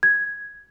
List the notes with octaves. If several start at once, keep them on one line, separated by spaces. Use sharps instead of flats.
G#6